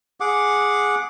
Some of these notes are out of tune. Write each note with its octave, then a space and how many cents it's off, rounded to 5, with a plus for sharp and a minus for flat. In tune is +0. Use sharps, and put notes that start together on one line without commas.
G#4 +0 F#5 -15 D6 +0